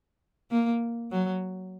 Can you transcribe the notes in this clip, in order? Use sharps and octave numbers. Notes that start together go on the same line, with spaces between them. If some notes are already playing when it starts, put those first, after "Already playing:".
A#3
F#3